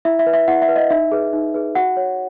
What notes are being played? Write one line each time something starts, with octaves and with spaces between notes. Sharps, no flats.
E4 E5
E5
B4
E5
E4 F#5
E5
B4
D#5
D#4 E5
G#4 B4
D#4
G#4 B4
F#4 F#5
C#5